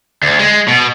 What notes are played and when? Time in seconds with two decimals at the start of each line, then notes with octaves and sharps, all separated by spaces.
0.23 D2
0.39 G#3
0.68 B2